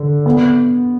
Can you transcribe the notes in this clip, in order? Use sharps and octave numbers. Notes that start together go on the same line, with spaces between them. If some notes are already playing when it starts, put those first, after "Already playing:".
Already playing: D3
B3